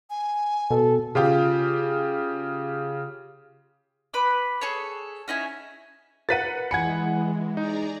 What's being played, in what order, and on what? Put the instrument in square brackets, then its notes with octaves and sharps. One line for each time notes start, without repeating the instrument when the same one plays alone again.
[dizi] G#5
[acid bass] B2 [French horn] A4
[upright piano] C#3 F4 G4
[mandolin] B4 B5 D6
G#4 A4 C#5
C#4 D#4 E4 G#5
[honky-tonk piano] A#4 B4 F#5 [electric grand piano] A6 B6 D#7
[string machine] E3 G#3 [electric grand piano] F#5 G#5 B5 [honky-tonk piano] G#6 C#7
[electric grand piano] D#4 [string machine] G#4 D5 A#5